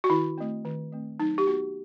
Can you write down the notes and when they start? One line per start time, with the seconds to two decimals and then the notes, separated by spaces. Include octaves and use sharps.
0.04 F#4
0.10 D#3 E4
0.38 A3 C4
0.65 D#3
0.92 A3 C4
1.19 F#3 D#4
1.38 G4
1.47 B3 F#4